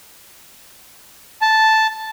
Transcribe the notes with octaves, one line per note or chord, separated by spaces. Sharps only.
A5